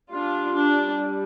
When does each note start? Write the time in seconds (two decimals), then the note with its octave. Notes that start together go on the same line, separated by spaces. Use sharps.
0.11 G3 D4 F4
0.54 D4